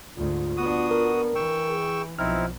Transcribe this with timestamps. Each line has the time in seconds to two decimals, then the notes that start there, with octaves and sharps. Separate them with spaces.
0.16 D2 G#2 F4
0.57 B3 D4 F#4 D#6
0.91 A#4
1.35 E3 G5 C#6 E6
1.68 G#4
2.19 B1 F3 C4 D#4 E4 F6